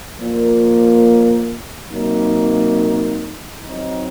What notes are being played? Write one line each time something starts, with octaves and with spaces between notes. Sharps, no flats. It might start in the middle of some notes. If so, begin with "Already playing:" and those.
A#2 F3 A#3 F4
C3 F#3 A#3 D#4
F#3 C4 D#4